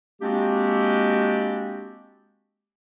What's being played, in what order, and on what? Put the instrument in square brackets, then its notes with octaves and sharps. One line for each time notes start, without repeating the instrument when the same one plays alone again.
[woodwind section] G#3 A#3 C4 D4 F#4 G4